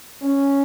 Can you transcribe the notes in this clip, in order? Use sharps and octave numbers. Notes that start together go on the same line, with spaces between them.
C#4